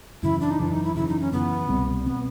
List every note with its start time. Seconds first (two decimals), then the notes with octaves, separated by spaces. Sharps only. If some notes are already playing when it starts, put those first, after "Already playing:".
0.23 F#2 C#3 E3 E4
0.41 D4
0.51 D#4
0.59 F#2 C#3 E3 D4
0.72 D#4
0.84 E4
0.96 F#2 C#3 E3 E4
1.08 D#4
1.20 C#4
1.33 F#2 C#3 E3 B3
1.69 C2 B2 G3 C4
2.06 G3 B3 C4
2.10 B2